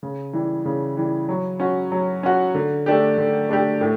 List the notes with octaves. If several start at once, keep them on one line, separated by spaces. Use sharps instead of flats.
C#3
E3 G3
C#3
E3 G3
F#3
C#4 F#4
F#3
C#4 F#4
D3
A3 D4 G4
D3
A3 D4 G4
A2